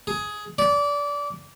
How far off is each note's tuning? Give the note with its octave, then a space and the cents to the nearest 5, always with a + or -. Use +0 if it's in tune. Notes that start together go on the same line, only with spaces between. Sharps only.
G#4 +10
D5 -25